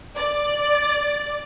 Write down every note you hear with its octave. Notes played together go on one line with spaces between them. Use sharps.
D5